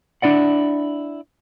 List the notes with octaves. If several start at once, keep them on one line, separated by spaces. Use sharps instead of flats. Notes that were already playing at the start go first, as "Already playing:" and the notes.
D4 E4 D5 F#5